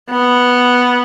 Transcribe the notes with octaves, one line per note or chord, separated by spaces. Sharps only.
B3